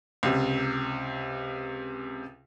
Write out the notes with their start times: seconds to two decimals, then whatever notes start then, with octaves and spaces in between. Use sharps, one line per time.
0.23 C#2 C3